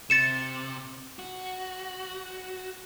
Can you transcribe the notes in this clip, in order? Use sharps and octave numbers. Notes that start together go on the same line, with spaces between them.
C3 A6 C#7 E7
F#4